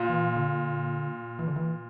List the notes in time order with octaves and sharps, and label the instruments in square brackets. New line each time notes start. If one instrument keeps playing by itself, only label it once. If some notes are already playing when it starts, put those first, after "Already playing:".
Already playing: [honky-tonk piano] A#2
[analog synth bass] E3
D3
E3
D3
E3